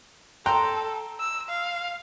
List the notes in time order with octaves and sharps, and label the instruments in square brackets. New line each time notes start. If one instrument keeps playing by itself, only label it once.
[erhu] A4 [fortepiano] G5 A#5 C6
[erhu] E6
F5